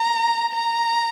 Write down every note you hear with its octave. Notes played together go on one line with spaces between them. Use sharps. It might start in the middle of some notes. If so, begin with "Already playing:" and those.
Already playing: A#5
A#5